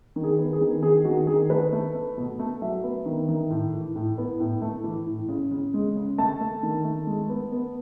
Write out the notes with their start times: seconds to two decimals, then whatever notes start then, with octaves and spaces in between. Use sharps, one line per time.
0.16 D#3
0.24 G#4
0.39 B3
0.53 G#4
0.61 D#3
0.83 D#3 G#4
1.05 D#3 F#4
1.27 D#3 G#4
1.50 A3 B4
1.72 A3
1.95 A3
2.17 B2
2.39 A3
2.62 F#3 E5
2.84 B3
3.06 D#3
3.28 D#3
3.50 A2
3.74 E3
3.96 A2
4.18 B3
4.40 A2
4.62 A3
4.84 E3
5.06 A2
5.29 C#3
5.51 C#3
5.74 G#3
5.96 C#3
6.18 A3 A5
6.41 A3
6.63 D#3
6.85 A3
7.07 G#3
7.29 B3
7.52 B3